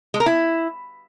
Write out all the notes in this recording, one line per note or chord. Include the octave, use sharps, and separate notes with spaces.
G#3
A#4
E4